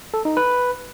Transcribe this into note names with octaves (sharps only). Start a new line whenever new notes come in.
A4
D#4
B4